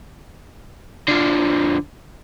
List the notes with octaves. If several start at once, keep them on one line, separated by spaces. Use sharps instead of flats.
D3 F3